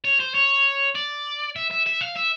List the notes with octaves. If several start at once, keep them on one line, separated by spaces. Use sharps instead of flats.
C#5
C5
C#5
D5
E5
E5
E5
F5
E5